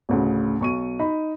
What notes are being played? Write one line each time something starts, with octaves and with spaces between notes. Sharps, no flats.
A1 D2 C#3
B1 C#6 D#7
D#4 B5